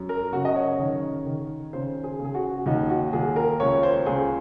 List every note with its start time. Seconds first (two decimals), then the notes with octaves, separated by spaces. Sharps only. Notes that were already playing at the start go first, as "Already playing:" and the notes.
Already playing: F#2
0.09 A#4
0.32 C#3 F#4
0.45 D#5
0.56 C#5
0.79 D#3
1.26 D#3
1.73 C#3 C5
2.04 G#4
2.20 C#3 G#4
2.35 F#4
2.66 D#2 D#4
2.90 F#4
3.13 D#2 G#4
3.36 A#4
3.60 C#2 C#5
3.83 C5
4.06 C#2 G#4